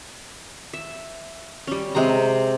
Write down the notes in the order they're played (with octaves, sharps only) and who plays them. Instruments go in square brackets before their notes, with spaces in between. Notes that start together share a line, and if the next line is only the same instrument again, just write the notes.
[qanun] E5
G3 C#4
C3 G#3 C4 A#5